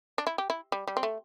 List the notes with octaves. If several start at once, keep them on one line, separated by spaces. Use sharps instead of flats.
D4
E4
G4
E4
G3
G3
C4
A3